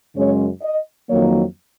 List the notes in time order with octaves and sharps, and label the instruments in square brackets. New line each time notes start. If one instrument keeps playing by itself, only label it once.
[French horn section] F#2 C#3 G#3 C#4 C#5
D#5
F2 D#3 F#3 A#3 C#5